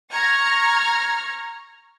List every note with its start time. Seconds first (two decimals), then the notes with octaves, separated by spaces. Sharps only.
0.12 A#5 C#6 F6 G#6 A#6